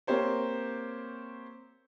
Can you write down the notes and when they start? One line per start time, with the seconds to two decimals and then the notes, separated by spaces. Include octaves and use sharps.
0.07 A#3 C4 G4 C5 C#5